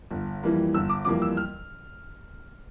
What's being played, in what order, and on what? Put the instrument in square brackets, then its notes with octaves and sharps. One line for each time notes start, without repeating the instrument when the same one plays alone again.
[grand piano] G1
F2 E3 G3 A#3
G1 E6
D6
F2 E3 G3 A#3 D6
E6
F6